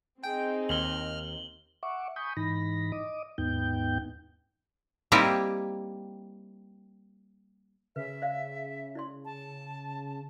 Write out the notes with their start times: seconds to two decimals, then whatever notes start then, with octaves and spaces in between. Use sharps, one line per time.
0.23 C4 D#4 G#4 G5
0.69 D#2 F6 F#7 G7
1.83 E5 F#5 C#6 D6
2.16 G#5 B5 C#6 D#6 G6
2.37 G#2 E3 D#4 B5 A#6
2.92 D#5 D6 D#6
3.38 D#2 G#2 B3 D#4 G5 G6
5.12 G3 A#3 C4 D#4 E4 G4
7.96 C#3 B4 E5
8.22 C5 D5 F5
8.95 E4 D5 C6
9.25 A5